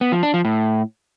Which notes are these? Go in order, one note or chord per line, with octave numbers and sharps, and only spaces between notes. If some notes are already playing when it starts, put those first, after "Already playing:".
B3
F3
D4
F3
A2